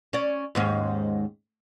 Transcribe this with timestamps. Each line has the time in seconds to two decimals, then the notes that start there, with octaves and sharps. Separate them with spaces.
0.13 C#4 D5
0.55 D#2 G#2 C#4